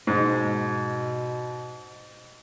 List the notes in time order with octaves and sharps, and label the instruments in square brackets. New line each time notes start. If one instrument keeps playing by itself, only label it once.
[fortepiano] G#2 [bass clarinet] B2